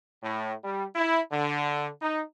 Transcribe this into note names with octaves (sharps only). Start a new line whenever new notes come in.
A2
G3
E4
D3
D#4